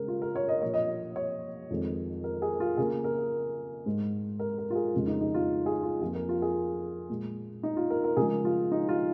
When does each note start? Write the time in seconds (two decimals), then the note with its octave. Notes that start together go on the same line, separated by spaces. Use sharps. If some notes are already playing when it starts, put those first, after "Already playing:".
Already playing: C#3 G#3 A#4
0.08 F4
0.22 A#4
0.36 C#5
0.48 D#5
0.62 A#2 F3 A#3 C#5
0.74 D#5
1.16 C#5
1.70 F2 D#3 G#3
2.24 A#4
2.42 G#4
2.60 F4
2.77 C#3 A#3 G#4
3.04 A#4
3.86 G#2 G#3
4.39 A#4
4.58 A#4
4.70 F4
4.75 G#4
4.94 F2 C#3 G#3
5.07 D#4
5.21 D#4
5.34 F4
5.66 G#4
5.83 F4
6.01 F2 F3 A#3 G#4
6.15 A#4
6.29 F4
6.42 G#4
7.10 A#2 G#3
7.63 D#4
7.77 F4
7.90 A#4
8.04 A#4
8.17 C#3 F3 G#3 G#4
8.45 F4
8.72 D#4
8.89 F4